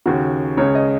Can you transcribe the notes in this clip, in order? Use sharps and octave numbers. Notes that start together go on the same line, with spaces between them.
D#2 C#3 F#4
C#2 C#3 C#5
D#5